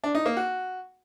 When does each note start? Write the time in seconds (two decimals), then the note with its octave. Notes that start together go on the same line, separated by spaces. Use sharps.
0.04 D4
0.15 D#4
0.26 A#3
0.37 F#4